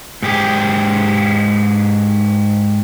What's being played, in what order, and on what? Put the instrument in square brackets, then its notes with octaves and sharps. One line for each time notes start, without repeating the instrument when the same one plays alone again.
[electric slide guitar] G#2 G4 G#4